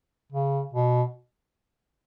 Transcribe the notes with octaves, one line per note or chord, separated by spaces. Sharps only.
C#3
B2